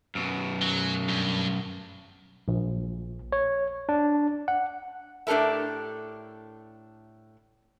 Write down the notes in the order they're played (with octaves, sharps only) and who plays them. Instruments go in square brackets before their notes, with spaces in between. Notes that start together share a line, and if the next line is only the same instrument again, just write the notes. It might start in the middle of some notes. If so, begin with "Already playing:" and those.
[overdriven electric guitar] F#2 B2
[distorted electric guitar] F#3
G2
[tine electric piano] A#1
C#5
D4
F#5
[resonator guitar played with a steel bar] A2 D4 G4 A4 A#4 E5